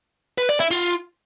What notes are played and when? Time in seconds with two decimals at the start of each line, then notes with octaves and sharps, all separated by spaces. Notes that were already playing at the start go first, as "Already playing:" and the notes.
0.38 B4
0.49 D5
0.60 E4
0.71 F4